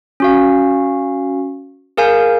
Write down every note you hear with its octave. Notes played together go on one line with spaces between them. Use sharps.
C#4 F#4 F5
G#4 A#4 F5 G#5 G6